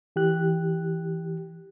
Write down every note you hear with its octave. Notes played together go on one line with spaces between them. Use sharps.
E3 G4 F#6